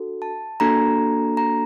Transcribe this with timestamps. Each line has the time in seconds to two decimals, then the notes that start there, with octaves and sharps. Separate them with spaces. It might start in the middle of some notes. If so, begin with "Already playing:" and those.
Already playing: D4 F#4 A4
0.22 A5
0.60 A#3 D4 F#4 A4 A#5
1.37 A#5